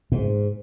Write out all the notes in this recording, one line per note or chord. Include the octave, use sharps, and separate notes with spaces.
G#2